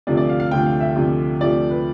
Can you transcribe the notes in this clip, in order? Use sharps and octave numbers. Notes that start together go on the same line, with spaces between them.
D2 C3 F3 A3 D5
D5
F5
F5
D2 C3 F3 A3 G5
F5
E5
D2 C3 F3 A3
D2 C3 F3 A3 D5
B4